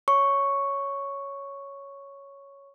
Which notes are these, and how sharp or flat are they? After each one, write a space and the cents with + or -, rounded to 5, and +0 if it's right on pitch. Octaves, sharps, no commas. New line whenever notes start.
C#5 +0 C#6 +0